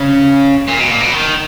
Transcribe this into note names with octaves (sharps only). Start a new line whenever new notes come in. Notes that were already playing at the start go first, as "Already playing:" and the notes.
Already playing: C#3
A#2
B2
A#2
B2
D#3